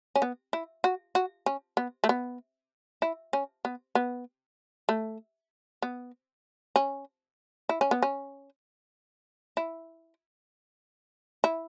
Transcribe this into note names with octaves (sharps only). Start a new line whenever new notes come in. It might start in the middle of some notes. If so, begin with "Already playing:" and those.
C#4
B3
E4
F#4
F#4
C#4
B3
A3
B3
E4
C#4
B3
B3
A3
B3
C#4
E4
C#4
B3
C#4
E4
E4